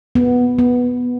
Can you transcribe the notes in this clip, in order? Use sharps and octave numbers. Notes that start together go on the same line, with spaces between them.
B3
B3